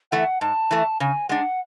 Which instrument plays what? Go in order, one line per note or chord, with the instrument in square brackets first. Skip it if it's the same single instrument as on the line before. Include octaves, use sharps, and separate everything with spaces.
[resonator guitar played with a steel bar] E3 A3 [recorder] F#5
[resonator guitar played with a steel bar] G#2 [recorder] A5
[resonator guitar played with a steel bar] E3 A3
[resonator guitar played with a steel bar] C#3 [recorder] G#5
[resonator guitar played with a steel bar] G#3 D4 [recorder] F#5